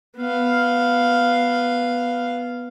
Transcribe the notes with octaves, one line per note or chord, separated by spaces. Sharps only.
B3 F5